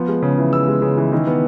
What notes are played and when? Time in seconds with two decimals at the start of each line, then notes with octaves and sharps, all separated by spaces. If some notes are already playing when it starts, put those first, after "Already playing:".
Already playing: F3 B3
0.08 G#3
0.22 C#3
0.38 E3
0.53 B3 E6
0.68 G#3
0.82 C#3
0.97 E3
1.12 D#3
1.27 B3